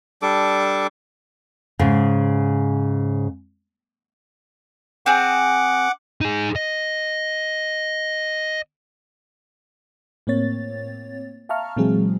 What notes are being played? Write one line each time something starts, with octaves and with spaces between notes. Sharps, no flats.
G3 D4 A4 D6
G#2 C#3
C4 G#4 F#5 D6
D#4 G#4
D#5
A2 A#3 C4 C#5 A6
E5 F5 A5 A#5 C#6 F6
A#2 E3 F#3 G#3 C4 G#4